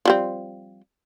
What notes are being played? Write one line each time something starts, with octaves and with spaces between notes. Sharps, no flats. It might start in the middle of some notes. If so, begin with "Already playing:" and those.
F3 G3 C4